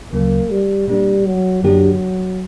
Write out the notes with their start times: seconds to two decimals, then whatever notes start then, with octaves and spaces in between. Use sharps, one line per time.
0.13 D2 C#3 F#3 A#3
0.50 G3
0.88 A#2 G3 A#3 D4
1.26 F#3
1.63 F#2 D3 F#3 A#3 D4 G4